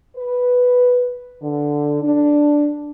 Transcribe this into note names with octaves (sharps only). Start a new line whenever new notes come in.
B4
D3
D4